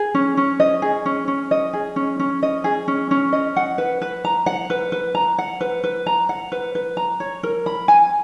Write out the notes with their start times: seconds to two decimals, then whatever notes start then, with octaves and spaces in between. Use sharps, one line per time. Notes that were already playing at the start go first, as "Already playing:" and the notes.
Already playing: G#4
0.14 C#4
0.37 C#4
0.60 D#5
0.82 G#4
1.06 C#4
1.28 C#4
1.51 D#5
1.73 G#4
1.96 C#4
2.19 C#4
2.42 D#5
2.64 G#4
2.88 C#4
3.11 C#4
3.32 D#5
3.56 F#5
3.78 B4
4.02 B4
4.24 A#5
4.46 F#5
4.70 B4
4.92 B4
5.15 A#5
5.38 F#5
5.61 B4
5.84 B4
6.06 A#5
6.29 F#5
6.52 B4
6.75 B4
6.97 A#5
7.20 C#5
7.43 A#4
7.66 B5
7.88 G#5